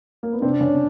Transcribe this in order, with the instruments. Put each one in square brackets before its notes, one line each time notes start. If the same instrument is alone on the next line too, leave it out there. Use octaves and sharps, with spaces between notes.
[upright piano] A#3
B3
[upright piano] C3 C4 [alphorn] D4
[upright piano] C#3 C#4